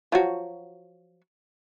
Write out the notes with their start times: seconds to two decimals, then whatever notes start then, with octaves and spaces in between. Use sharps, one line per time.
0.12 F3 F#3 F#4